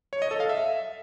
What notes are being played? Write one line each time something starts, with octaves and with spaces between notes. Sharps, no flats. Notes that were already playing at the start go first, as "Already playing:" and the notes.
C#5
D#5
A4
F5
E5